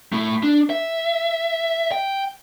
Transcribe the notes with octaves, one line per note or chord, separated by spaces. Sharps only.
A3 E4
D4
E5
G5